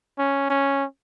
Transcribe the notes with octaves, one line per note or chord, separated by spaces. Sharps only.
C#4
C#4